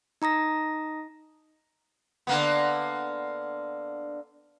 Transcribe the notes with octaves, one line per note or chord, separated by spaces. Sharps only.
D#4 A#5 D#6 A#6
D3 A#3 B3